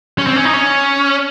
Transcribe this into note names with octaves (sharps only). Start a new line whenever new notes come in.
C#4
C4
C#4
D#4
C#4